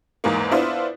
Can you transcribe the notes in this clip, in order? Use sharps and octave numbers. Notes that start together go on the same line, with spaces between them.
E2 G#2 A#3
B3 D4 E4 F4 C5